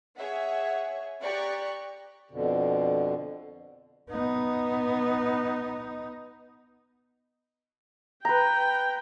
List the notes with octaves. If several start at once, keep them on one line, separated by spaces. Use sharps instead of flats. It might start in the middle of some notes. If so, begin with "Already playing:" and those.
G#4 C#5 E5 F#5
G4 D5 A#5 C#6 F#6
F2 B2 D3
B3 D#4
B4 G5 A#5